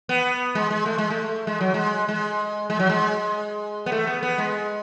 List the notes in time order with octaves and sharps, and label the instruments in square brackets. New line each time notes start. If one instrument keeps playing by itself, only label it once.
[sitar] B3
G#3
G#3
A3
G#3
A3
G#3
F#3
G#3
G#3
G#3
F#3
G#3
B3
A3
B3
B3
G#3